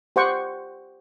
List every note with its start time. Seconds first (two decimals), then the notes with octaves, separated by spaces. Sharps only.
0.16 G4 C5 F#5 G5 C#6